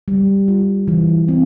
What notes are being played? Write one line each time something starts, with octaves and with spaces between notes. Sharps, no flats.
G3
F4
E3
C4